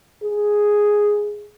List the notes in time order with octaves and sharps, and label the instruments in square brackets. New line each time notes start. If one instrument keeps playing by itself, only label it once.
[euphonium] G#4